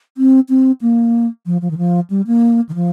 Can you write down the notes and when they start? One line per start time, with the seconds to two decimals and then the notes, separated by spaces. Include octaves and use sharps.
0.17 C4
0.49 C4
0.81 A#3
1.46 F3
1.62 F3
1.71 D#3
1.78 F3
2.10 G3
2.27 A#3
2.69 D#3
2.75 F3